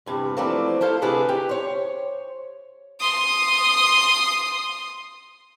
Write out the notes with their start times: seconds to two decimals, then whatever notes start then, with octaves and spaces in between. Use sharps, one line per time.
0.06 E2 G2 C3
0.37 E3 F3 A3 A#3 C4 D4
0.81 E4 A4 C5 F5
1.02 D2 C3 E4 G#4 B4 A5
1.29 G4
1.49 C5 C#5
3.00 C6 D#6